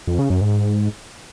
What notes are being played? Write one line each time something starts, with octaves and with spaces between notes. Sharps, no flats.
F2
C#3
F#2
G#2